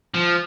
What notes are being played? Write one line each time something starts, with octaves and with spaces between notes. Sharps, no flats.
F3